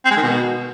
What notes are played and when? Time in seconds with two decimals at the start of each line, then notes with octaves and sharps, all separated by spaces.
0.05 C4
0.11 G#3
0.17 D#3
0.23 B2